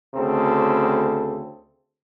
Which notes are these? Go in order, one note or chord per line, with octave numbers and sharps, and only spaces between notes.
D2 C#3 C4 A4